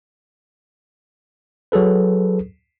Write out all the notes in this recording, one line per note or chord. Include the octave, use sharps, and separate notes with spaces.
F#3 G#4 A4 B4